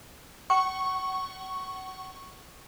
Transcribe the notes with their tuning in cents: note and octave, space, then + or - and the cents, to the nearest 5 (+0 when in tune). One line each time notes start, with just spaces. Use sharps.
F#5 +35 C#6 -5